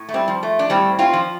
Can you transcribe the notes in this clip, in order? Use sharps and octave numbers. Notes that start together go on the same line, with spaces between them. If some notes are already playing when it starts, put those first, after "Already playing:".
Already playing: A2
A3
G3 C4
F3
A3
D4
A2 G3 C4
C4 F4
F3